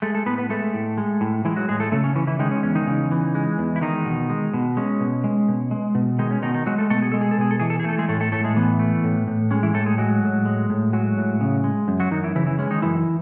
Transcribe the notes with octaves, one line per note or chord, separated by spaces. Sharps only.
G#3 A3 A4
A3 A4
A2 B3 B4
B3 B4
G#3 A3 A4
A2
G#3
A2
E3 G#3 E4
F#3 F#4
A2 G#3 G#4
A3 A4
C#3 A3 A4
C#4
E3 C#4
E3 E4
D#3 G#3 D#4
C#4
E2 C#4
D#3 D#4
C#3
E3
G#3
E2
E4
D#3 G#3 D#4
B2
G#3
B2
G#3 C#4
B2
G#3
B2
G#3
B2
D#3 G#3 D#4
C#4
B2 D#3 D#4
D#3 D#4
F#3 G#3 F#4
A3 A4
B2 A3 A4
G#4
G#3 A4
G#4
A4
B2 G#4
A4
E3 G#4
A4
G#4
A3 A4
G#3 G#4
A2 A3 A4
A3 A4
A2 A3 A4
G#3 G#4
E3 B3
A3
A2
A2
G#3 C#4
E3 E4
A2 A3 A4
G#3 G#4
F#3 G#3 F#4
A2
G#3
A2
F#3 G#3 F#4
A2
C#3
G#3
F#2
F#3 F#4
F#2 D#3 D#4
E3 E4
C#3 E3 E4
E3 E4
G#3 C#4
D#3 D#4
F#2 E3 E4